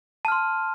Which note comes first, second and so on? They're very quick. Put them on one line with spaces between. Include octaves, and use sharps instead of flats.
A5 F6 C6